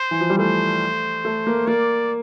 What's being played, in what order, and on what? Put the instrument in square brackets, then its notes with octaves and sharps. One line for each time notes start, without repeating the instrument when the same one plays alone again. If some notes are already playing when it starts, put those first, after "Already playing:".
Already playing: [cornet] C5
[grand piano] E3
F3
G3
[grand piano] A3 [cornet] C5
[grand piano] A3
A#3
[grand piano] A#3 [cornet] D5